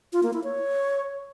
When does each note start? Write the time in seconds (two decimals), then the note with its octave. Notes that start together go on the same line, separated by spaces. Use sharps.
0.13 F4
0.23 A#3
0.33 E4
0.44 C#5